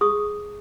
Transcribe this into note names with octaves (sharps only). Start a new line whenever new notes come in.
G#4 C#6 D#6